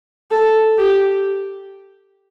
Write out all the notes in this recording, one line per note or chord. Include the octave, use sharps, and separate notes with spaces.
A4
G4